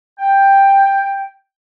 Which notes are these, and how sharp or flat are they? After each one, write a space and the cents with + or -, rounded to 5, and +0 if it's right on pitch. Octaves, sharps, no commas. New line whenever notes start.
G5 +10